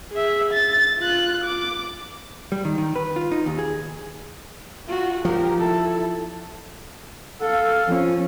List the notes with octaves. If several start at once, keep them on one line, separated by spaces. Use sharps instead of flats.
G#4 E5
A6
F4 F#6
D6
G3
D#3
D#3
B4
F4
D#4
D#2
G#4
F4 F#4
F3 G4 A#4
E4 A4
A4 F5
F3 C#4